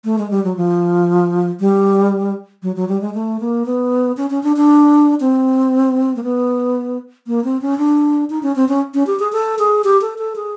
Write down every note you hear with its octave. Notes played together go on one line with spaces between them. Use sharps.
A3
G#3
G3
F#3
F3
G3
F#3
F#3
G3
G#3
A3
A#3
B3
C#4
C#4
D4
D4
C4
A#3
B3
A#3
C4
C#4
D4
D#4
C#4
C4
C#4
C#4
G4
G#4
A4
G#4
G4
A4
A4
G#4